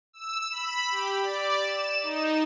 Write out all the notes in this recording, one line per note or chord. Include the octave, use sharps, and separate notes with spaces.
E6
B5
G4
D5
E7
D#4